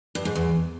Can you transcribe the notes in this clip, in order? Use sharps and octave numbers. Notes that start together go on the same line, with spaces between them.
G2
G#2
E2